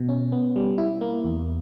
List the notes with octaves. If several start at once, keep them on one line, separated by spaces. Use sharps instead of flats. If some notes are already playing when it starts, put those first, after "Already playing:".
Already playing: B2
C#4
B3
G3
E4
A#3
E2